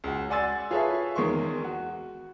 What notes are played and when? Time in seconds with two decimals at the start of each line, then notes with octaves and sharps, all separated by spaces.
0.04 C#2 F#4
0.30 D5 F#5 G#5 C6 E6 A6
0.71 F4 G#4 A4 B4 C#5 E5
1.15 E2 D#3 G#3 C6 C#6
1.64 F#4